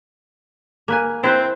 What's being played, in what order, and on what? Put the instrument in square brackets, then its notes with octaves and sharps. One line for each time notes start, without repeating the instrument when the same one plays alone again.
[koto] A#3 B4 G#5
[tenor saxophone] C4 [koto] E4 B4 C5